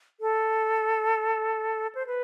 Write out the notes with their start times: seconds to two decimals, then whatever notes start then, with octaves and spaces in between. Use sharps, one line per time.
0.20 A4
1.95 C5
2.07 B4